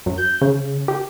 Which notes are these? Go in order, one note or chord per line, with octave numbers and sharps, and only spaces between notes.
F#2
G6
C#3
G4